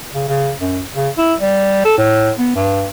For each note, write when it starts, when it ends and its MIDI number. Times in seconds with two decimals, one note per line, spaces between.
0.14 0.28 49
0.29 0.52 49
0.59 0.81 42
0.95 1.09 49
1.18 1.35 64
1.40 1.83 55
1.85 1.95 69
1.98 2.31 45
2.39 2.53 59
2.55 2.89 43